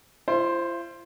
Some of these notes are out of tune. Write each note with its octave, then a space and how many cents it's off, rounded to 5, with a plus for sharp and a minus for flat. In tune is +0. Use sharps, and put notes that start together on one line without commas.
F4 -45 C5 +10